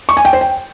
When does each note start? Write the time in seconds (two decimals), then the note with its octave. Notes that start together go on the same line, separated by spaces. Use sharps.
0.09 C#6
0.17 G#5
0.25 G5
0.33 C5
0.41 G5